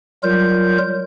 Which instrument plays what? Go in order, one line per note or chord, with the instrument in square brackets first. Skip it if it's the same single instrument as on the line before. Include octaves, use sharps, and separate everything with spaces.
[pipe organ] F#3 G3 F4 A#4 G6